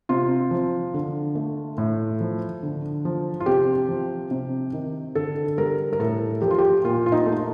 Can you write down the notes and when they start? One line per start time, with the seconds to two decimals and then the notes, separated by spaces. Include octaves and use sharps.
0.09 C3 F4
0.51 F3
0.94 D3
1.35 A3
1.78 A2
2.21 F3
2.63 D3
3.05 F3
3.40 F4
3.46 C3 G4
3.89 F3
4.31 C3
4.73 D#3
5.15 D3 A4
5.58 G3 A#4
5.93 A#4
6.00 A2 A4
6.42 F3 G4
6.51 F4
6.58 G4
6.84 A#2 F4
7.06 F4
7.12 D#4
7.26 A3